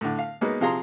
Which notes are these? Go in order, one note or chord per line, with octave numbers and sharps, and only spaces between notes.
A2 D3
F5
F#3 G#3 A#3 B3 D#4
C3 F3 G#4 F5 A#5 C6